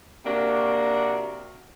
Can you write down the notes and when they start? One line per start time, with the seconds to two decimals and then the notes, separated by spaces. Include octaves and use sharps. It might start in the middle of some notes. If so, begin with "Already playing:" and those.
0.25 C3 A#3 D4 F#4 A#4